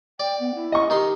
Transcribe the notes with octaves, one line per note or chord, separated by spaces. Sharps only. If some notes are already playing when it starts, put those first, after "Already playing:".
D5 G5
B3
E4
D#5 C#6
D#3 D#4 G4 C6